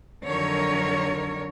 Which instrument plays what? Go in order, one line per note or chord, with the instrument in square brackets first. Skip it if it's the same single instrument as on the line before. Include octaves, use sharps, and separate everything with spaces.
[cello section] F2 D3 D#3 F#3 A#4 C#5